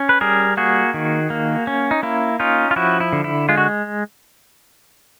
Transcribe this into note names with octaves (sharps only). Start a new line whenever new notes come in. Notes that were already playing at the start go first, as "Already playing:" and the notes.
Already playing: C#4
B4
G3 G#4 A#4
A#3 F#4 G#4
D#3
A#3
C#4
D#4
A#3 E4
C#4 D#4 F4
F4
F3 E4 F#4
E4
D3
E4
G#3 F4
F#4